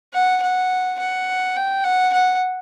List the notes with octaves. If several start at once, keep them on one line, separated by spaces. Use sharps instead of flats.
F#5
F#5
F#5
G5
F#5
F#5